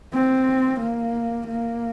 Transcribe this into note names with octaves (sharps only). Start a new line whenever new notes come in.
C4
A#3
A#3